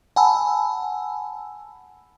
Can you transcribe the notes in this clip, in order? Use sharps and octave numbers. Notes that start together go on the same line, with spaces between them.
F#5 G#5 A5 B5 E6